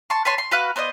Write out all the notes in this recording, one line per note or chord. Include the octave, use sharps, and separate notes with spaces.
A5 C6 C#6
B4 C#5 A5 C6
C6
F#4 B4 F5 F#6
B3 C5 D5 D#5